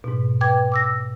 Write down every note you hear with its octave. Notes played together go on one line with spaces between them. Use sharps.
G#2 B2
B4 G5 D6 G#6
D6 E6 A#6